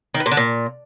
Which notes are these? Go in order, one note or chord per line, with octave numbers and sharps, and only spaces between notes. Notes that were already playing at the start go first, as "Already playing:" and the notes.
D#3
B3
A#2
D3
A#2